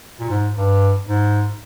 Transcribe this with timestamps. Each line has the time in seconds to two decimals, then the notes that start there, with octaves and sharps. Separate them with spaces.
0.20 A#2
0.30 G#2
0.56 G2
1.07 G#2